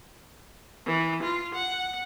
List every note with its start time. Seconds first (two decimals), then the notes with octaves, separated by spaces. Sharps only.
0.86 E3
1.23 F4
1.55 F#5